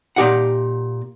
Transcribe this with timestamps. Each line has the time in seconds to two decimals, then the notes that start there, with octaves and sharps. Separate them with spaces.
0.16 A#2 D#4 G4 F5 F#5